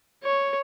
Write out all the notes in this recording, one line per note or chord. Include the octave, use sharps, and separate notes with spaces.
C#5